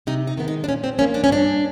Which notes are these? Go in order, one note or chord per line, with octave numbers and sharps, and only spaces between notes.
C3 D#4
D#4
D#3 G#3 B3
D#4
D4
A#2 C#4
C4
F3 A#3 C#4
D4
C#4
G2 D4